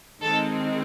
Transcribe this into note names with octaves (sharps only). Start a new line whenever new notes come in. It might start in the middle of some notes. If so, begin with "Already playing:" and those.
D#3 G#3 C4 A4